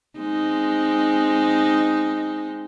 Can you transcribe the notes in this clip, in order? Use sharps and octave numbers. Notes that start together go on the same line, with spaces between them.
G#3 C4 D#4